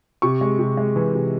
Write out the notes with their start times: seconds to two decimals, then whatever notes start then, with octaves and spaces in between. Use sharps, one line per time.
0.22 C3 C#6
0.41 G#3
0.59 C3
0.77 G#3
0.96 E3
1.15 C3